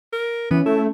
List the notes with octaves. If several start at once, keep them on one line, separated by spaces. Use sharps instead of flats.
A#4
E3 B3 C#4
A3 E4